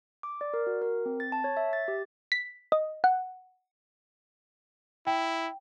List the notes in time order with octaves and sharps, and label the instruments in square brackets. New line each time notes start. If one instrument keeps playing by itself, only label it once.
[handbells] D6
D5
A#4
F#4
A#4
C4
A6
A5
C#5
E5
A6
G4
[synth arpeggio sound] B6
D#5
F#5
[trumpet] E4 [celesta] G5